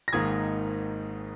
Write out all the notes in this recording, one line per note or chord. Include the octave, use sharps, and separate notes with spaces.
A#6
G#1 G#2 D#3 A#3 D#6 G#6